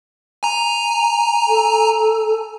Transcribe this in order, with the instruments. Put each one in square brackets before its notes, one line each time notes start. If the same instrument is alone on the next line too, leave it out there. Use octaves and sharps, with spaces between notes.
[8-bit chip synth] G#5 A#5
[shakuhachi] A4